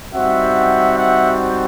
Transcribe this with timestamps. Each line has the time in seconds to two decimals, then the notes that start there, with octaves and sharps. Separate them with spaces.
0.14 G3 C4 D#4 F#4 E5 F#5
0.98 E5 F#5